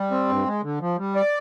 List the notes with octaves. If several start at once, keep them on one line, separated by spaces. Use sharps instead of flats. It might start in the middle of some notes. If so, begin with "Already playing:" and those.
Already playing: G3
C4
G2
G#3
D3
F3
G3
D5